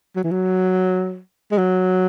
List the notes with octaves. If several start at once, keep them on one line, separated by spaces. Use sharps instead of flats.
F#3
E3
F#3
G#3
F#3